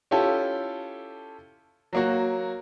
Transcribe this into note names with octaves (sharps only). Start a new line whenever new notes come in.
C#4 E4 F4 G4 A4
F#3 A#3 F#4